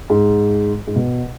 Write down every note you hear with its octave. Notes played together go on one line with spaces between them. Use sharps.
G#2
G#2
B2